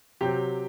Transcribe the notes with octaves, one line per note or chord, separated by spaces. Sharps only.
C3 F#3 G4